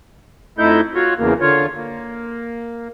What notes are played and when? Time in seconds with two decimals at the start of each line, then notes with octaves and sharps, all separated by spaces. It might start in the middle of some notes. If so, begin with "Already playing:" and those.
0.59 F2 A3 D#4 E4 G6
0.95 F4 F#4 C#5
1.18 E2 C#3 A#3
1.41 D3 F4 C#5
1.76 A#3